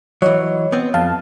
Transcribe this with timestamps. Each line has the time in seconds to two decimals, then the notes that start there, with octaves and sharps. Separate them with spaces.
0.22 E3 F#3 C#5 D#5
0.72 B3 C4
0.94 F2 F5 A5